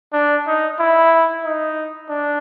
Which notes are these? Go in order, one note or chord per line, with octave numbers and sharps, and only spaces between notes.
D4
D#4
E4
D#4
D4